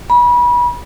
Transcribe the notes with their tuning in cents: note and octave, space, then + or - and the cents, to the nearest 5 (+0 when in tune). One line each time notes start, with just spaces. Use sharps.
B5 -30